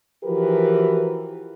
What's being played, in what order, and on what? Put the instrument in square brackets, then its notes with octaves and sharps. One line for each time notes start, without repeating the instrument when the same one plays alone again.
[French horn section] E3 F3 F#4 G4 A#4 B4